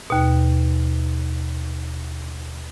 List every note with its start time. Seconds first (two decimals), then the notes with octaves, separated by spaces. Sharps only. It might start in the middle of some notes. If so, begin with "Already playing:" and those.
0.10 D#2 B2